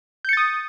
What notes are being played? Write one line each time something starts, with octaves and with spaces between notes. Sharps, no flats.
D#6 G6 A6 C#7